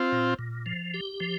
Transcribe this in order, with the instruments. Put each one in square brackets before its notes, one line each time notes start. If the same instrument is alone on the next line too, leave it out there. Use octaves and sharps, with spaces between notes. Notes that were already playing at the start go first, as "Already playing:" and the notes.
Already playing: [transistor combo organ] C4 F4
[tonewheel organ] A#2
A#2
F3
G4
F3